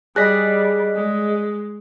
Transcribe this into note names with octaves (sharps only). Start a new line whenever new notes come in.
G3 G#4 D5 D#5 F#6 A#6 B6
G#3